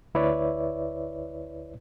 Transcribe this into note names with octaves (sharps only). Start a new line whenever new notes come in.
D2 E4 B4 C#5 D5 E5